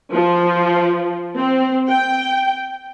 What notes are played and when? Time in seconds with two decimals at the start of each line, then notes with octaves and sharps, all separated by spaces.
0.13 F3
1.37 C4
1.89 G5